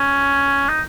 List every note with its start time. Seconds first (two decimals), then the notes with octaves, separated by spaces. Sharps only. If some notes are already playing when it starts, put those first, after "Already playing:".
Already playing: C#4
0.69 D#4